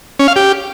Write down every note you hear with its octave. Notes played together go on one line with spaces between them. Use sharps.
C#4
F5
G4